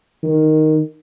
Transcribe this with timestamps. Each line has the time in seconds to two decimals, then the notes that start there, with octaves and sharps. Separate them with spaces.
0.23 D#3